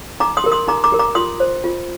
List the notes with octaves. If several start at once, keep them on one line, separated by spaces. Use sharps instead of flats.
D#4 A#5 D6
C6 D#6
G4 A#4
C6 D#6
D#4 A#5 D6
A#5 D6
G4 A#4
A#5 D6
F4 C6 D#6
C5
F4